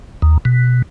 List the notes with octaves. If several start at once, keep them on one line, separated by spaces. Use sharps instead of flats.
D#2
B2